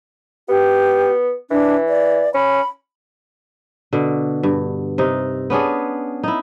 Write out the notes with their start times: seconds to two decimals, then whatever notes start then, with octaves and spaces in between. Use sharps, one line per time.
0.49 B3 G4
1.51 E3 D4
1.89 D5
2.34 C#4 B5
3.93 B2 D3
4.43 G2
4.98 C3 D#4
5.50 B3 C#4 D4 G#4
6.23 D#4 E4